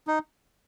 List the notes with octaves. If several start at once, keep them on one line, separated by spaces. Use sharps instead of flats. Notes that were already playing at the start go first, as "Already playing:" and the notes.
D#4